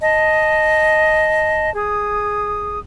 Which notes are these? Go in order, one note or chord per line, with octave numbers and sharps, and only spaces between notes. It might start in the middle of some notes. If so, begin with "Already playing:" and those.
D#5 A5
G#4 D#6